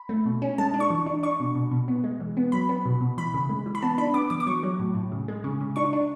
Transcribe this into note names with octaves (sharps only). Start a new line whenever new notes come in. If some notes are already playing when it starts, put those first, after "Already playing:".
Already playing: B5
A3
B2
C#4
G#3 A5
D4
C#6
E3
D4
D4 C#6
B2
B2
B2
B3
G#3
E3
B3
F#3 B5
B3
B2
B2
E3 B5
C#3
G#3
E3
B5
B3 A5
D4 B5
B3 D6
E3 D6
D6
F#3 C#6
F#3
A2
A2
C#3
G#3
C#3
C#3
D4 C#6
D4